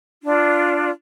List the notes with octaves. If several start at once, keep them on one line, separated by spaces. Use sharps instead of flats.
D4 F4